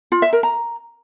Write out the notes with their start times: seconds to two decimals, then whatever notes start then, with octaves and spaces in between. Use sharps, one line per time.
0.12 F4
0.22 E5
0.33 A#4
0.43 A#5